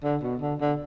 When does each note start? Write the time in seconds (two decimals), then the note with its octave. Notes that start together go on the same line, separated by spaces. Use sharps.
0.04 D3
0.23 B2
0.41 D3
0.61 D3